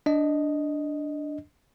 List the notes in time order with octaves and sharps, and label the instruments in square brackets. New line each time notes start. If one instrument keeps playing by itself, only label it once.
[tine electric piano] D4 D#5